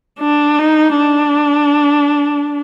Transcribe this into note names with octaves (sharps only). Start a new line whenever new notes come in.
D4
D#4
D4